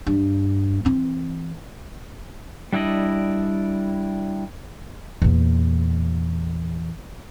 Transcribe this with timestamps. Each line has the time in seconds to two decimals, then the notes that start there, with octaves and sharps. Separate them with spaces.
0.06 G2
0.85 E3 C4
2.73 G3 D4 E4 D5 D#5
5.22 E2 A#2